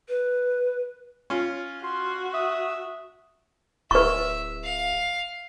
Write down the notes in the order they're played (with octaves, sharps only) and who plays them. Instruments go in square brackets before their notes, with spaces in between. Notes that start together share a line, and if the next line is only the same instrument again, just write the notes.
[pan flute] B4
[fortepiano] C#4 F4
[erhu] F#4 [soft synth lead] C6
[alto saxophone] E5 [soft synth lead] D#6
[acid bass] D1 [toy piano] B4 C#6 [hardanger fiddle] E5
[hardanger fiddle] F5